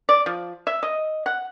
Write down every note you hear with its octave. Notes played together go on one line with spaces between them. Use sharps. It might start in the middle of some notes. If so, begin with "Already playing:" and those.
D5
F3
E5
D#5
F#5